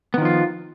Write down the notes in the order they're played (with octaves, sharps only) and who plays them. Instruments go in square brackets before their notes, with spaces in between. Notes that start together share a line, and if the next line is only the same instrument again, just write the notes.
[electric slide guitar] B3
D#3
F3
F4